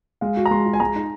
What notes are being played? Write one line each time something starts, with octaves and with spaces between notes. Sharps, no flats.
G#3 F5
F#4
A#5
G#3 C6
F4
G#5
G#3 A#5
D#4